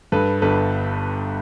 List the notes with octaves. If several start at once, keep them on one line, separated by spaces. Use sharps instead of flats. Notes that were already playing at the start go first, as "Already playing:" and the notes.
G2 A4 B4
G1 A4 B4